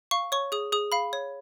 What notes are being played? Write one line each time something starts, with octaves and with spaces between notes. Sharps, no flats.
F5 C#6
C#5 C#6
G#4 D#6
G#4 D#6
F5 B5
C#5